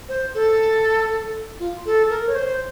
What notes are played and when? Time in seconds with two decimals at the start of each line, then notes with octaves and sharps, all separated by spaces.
0.09 C5
0.34 A4
1.60 F4
1.85 A4
2.10 A#4
2.28 C#5
2.35 C5